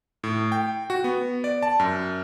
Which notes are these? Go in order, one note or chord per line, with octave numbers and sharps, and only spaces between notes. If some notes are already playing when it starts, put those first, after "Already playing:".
A2
G5
F#4
B3
D5
A5
F#2